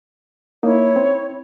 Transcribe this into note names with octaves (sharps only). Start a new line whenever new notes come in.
A#3 D#4 E4 C#5
C4